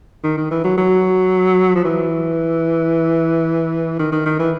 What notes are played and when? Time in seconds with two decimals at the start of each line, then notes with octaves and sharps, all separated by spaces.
0.24 D#3
0.37 D#3
0.51 E3
0.64 F#3
0.78 F#3
1.75 F3
1.85 E3
3.99 D#3
4.12 D#3
4.26 D#3
4.39 E3